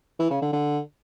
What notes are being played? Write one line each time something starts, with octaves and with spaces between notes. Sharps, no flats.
E3
C#3
D3
D3